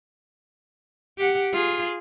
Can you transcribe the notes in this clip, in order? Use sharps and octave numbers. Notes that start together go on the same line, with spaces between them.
G4 F#5
F4 G#4